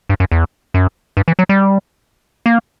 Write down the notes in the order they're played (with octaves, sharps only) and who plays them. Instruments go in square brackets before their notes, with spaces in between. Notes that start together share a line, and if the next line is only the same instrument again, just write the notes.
[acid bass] G2
F#2
E2
F#2
G2
E3
F#3
G3
A#3